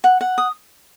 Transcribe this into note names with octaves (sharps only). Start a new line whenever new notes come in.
F#5
F#5
D#6